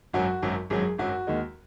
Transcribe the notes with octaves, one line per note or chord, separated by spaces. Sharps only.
G#1 F#2 F#3 F#4
G#1 F#2 F#3
G#1 F#2 F#3 G#4
G#1 F#2 F#3 F#4
D#2 D#3 G#3